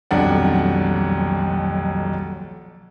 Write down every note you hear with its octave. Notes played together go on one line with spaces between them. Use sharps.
D#1 B1 F2 D4 D5 F#5